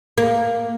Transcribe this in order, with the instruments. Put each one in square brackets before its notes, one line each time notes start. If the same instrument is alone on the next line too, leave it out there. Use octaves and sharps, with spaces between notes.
[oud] A#3